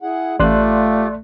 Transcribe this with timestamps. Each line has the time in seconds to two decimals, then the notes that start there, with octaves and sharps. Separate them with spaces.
0.02 E4 G#4 F#5
0.40 A1 A3 F4 G4 D5 C6 F#6